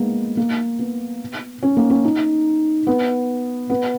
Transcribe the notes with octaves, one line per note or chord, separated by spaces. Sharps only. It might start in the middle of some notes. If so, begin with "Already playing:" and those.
Already playing: G#3 A#3 B3
A#3
B3
C#4
A#3
C#4
D#4
B3
B3